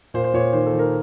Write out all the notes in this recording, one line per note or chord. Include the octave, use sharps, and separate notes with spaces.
A#2 C5
C5
A#2 C#5
D#3 C5
A4
D#3
A#4